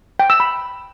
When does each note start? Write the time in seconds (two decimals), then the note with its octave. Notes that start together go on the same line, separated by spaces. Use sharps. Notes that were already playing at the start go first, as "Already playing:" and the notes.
0.20 G5
0.30 E6
0.40 B5